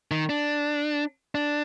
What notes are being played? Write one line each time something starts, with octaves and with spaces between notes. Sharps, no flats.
D#3
D4
D4